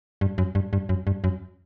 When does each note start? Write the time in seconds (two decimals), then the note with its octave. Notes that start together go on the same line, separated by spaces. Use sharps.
0.21 G2
0.38 F#2
0.55 G2
0.73 G2
0.89 F#2
1.07 G2
1.24 F#2